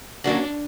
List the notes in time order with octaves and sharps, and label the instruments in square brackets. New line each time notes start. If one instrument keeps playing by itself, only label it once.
[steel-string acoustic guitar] D3 F#3 A#3 C#4 [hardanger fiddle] D4